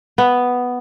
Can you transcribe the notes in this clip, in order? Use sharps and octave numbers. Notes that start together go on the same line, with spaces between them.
B3